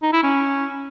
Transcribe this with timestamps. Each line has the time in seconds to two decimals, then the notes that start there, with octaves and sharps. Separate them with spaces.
0.02 D#4
0.13 E4
0.23 C#4